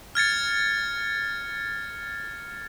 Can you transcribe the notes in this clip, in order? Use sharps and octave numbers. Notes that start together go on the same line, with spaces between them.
F6 G#6 A6 C#7